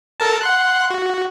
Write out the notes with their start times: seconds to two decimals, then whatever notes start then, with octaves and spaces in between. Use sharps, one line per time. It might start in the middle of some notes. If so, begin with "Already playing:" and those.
0.20 A4 A#4 A5
0.41 F#5 C6 F#6
0.90 F#4